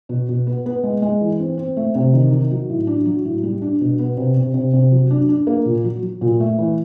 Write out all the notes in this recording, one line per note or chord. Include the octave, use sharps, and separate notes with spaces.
B2
B2
B3
B3
G#3
G#3
E3
C4
C4
A3
C3
D#3
D#3
F#3
A2
D4
F#3
A2
G3
D4
B2
B3
C3
C3
C3
C3
F#3
D4
D4
A#3
A#2
F#3
F#3
A#2
A3
E3